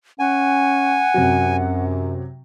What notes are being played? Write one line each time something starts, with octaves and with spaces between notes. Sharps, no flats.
C#4 F#5 G#5
F#2 C3 F#3